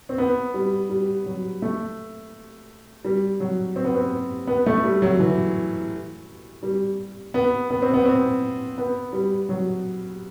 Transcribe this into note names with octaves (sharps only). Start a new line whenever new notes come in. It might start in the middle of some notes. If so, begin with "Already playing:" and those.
C4
B3
G3
G3
F#3
A3
G3
F#3
C4
B3
C4
B3
A3
G3
F#3
E3
G3
B3
B3
C4
B3
C4
B3
G3
F#3